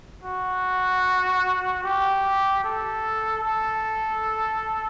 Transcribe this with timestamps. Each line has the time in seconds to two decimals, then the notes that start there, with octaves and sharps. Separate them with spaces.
0.23 F#4
1.84 G4
2.64 A4
3.44 A4